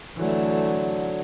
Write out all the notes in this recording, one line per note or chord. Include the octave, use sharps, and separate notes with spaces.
D3 E3 F#3 A3